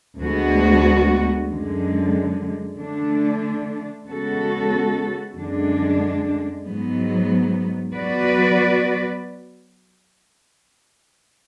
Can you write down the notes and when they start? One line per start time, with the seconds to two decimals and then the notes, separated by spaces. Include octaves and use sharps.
0.21 D2 D3 G#3 B3 F#4
1.49 F#2 D3 G#3
2.79 D3 A3 D4
4.07 C#3 G#3 B3 F#4 A4
5.36 F#2 D3 G#3 D4
6.65 G#2 F#3 B3
7.94 F#3 B3 F#4 B4 D5